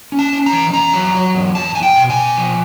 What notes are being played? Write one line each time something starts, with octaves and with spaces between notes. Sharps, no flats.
C#4
A5
C#4
A#5
E3
E2 A#5
F#3
F#3
E2
E2 A5
E2 G#5
G5
B2
G#5
B2
F3